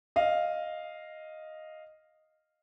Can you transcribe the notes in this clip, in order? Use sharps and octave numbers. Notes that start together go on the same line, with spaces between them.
D#5 F5